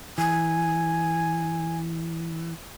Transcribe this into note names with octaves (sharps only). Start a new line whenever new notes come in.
E3 G#5